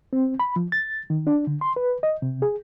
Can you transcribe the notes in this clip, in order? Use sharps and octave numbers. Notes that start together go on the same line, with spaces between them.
C4
B5
F3
A6
D#3
D4
D3
C6
B4
D#5
C3
G#4